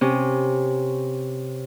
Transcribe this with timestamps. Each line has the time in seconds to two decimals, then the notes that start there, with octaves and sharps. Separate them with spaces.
0.01 C3 C#4